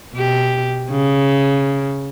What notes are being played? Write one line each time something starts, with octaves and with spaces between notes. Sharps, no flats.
B2 G4
C#3